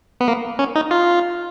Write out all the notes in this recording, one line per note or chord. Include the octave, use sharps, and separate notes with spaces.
B3
A#3
C#4
D#4
F4